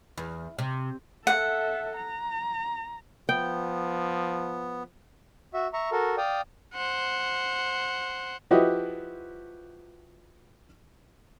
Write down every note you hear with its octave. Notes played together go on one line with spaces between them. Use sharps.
E2
C3
A4 E5 F#5
A#5
F3 B3 G5
F#4 E5
E5 A#5 C#6
F#4 A4 A#4
D5 F5 G5 D#6
C5 F#5
F3 E4 F#4 G4 B4 D#5